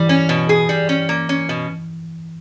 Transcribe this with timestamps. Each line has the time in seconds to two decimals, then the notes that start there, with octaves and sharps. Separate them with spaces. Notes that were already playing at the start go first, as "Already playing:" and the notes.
Already playing: E3 G3
0.09 C#4
0.29 B2
0.49 G#4
0.69 G3
0.89 C#4
1.09 A#3
1.29 C#4
1.49 B2